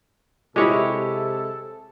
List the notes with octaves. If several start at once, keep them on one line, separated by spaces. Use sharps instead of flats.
C3 G#3 E4 G4 A4 C#5